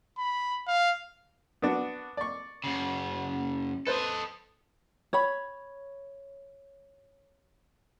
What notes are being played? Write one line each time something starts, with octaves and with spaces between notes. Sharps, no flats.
B5
F5
B3 D4 F#4
D5 C#6
F#2 C#3
A4 B4 C5 D#5
C#5 B5